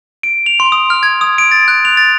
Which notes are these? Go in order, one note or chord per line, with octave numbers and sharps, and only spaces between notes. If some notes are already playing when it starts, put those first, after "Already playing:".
D7
F7
C6
D#6
F6
G#6
D#6
D7
A6
F#6
F7
A6